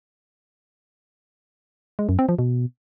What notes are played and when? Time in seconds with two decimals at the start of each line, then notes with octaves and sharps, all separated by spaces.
1.99 G#3
2.09 F#2
2.19 C4
2.29 F3
2.39 B2